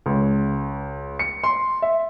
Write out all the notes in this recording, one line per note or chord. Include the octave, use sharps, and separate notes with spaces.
C#2
C#7
C6
E5